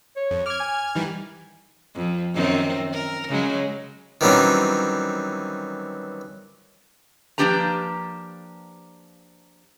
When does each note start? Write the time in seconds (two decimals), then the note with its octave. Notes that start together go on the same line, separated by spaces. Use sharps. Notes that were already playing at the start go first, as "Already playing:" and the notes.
0.16 C#5
0.31 F2
0.46 D6 F6 G#6
0.60 G#5
0.95 D#3 E3 G3
1.95 F2
2.34 F#2 D#3 C4
2.92 A#4
3.29 C#3 F#3 G#3
4.21 D#3 E3 F#3 G3 C4 C#4
7.38 F3 A#3 D4 G4 B4 A#5